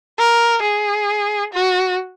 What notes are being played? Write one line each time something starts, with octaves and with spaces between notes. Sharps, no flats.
A#4
G#4
F#4